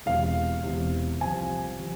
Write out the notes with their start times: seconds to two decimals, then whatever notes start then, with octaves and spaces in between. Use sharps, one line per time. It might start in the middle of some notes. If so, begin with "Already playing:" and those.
0.06 E1 E2 C3 F5
0.63 E1 E2 C3
1.21 C2 C3 F3 G#5
1.79 C3 F3